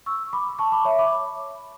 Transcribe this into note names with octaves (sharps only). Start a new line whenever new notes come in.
C#6 E6
B5 D6
A5 C#6
B5 D6
C#5 E5
B5 D6